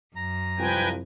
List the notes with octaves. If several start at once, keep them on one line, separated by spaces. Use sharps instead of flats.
F#2 A#5
C2 F3 B4 G5 G#5